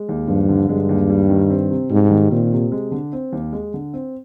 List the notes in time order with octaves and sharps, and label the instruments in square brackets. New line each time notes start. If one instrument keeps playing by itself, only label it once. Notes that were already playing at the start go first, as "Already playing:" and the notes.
Already playing: [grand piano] G#3
D#2
[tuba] G2 [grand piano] F3
[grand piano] D3
[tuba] G2 [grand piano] G#3
[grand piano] D#2
G3
D#3
C4
C3
[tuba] G#2 [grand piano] G3
[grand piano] D#3
[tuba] A#2 [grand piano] C4
[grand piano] C3
G#3
D3
C4
D#2
G#3
D3
C4